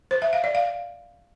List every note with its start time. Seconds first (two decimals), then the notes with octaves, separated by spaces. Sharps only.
0.11 C5
0.22 E5
0.33 F5
0.44 D5
0.55 F5